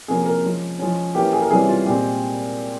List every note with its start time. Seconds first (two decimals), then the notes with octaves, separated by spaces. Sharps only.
0.08 C3 F3 A#3 C#4 G#4
0.26 A#4
0.43 F3 G#3 C#4
0.79 F3 G#3 C#4
1.15 E3 A#3 C#4 G4
1.33 G#4
1.42 A#4
1.50 C3 E3 G3 C#4 G#4
1.69 F4
1.86 A#2 G#3 C4 G4